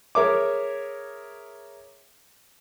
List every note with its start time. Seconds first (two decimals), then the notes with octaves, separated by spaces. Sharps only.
0.15 G#4 A#4 C#5 E5 D6